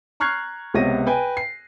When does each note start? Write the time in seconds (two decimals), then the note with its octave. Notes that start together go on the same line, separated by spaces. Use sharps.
0.20 A#5 C#6 F6 F#6 G#6 C7
0.74 C#2 C3 B3 C#5 A#6 D#7
1.07 B4 G5 G#5
1.37 C7